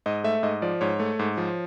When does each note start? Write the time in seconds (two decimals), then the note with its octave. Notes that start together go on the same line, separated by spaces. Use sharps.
0.06 G#2 D#5
0.24 A3 E5
0.43 G#2 D#5
0.62 F3 D5
0.81 G#2 C#5
1.00 A3
1.19 G#2
1.37 F3